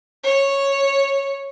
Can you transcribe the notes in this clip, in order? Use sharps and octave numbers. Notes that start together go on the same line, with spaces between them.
C#5